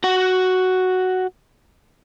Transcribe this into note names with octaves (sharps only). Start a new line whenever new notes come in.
F#4 F#5